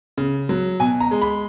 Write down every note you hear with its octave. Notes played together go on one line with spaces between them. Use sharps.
C#3
F#3
B2 G#5
A#5
G#3
B5